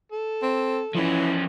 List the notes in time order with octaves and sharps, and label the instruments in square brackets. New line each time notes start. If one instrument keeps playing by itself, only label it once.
[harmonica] A4
[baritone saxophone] C4
[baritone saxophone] E3 [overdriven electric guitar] F3 C#4